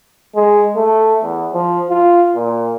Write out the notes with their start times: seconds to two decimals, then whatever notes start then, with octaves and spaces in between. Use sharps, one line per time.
0.35 G#3
0.76 A3
1.23 E2
1.53 F3
1.90 F4
2.35 A#2